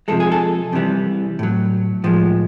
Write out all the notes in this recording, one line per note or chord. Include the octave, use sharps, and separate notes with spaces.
C3 F3 G#3 A4
G#4
A4
C3 E3 G3
A2 F#3
A2 F3 G#3